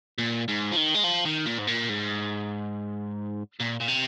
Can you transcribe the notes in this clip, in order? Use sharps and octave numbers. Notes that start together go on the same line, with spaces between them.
A#2
G#2
F3
D#3
G#3
F3
D#3
A#2
G#2
A#2
G#2
A#2
A#2
C3